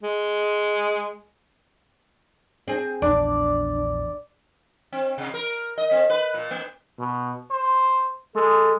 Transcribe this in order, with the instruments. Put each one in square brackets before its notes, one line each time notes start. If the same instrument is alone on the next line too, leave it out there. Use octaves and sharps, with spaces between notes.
[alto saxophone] G#3
[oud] C4 G#4
[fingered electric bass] A#1 E2 [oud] D4 [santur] D5
[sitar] C4
C3
A#4
D#5
C4
B4
A#2
A#3
[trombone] B2
C5
[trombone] G#3 [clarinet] A4